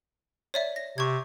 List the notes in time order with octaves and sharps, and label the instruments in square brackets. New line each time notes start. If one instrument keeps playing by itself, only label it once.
[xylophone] C#5 D5 E5
A#6
[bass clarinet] C3 [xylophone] C#6 G#6